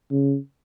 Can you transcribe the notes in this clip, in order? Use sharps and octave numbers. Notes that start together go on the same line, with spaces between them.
C#3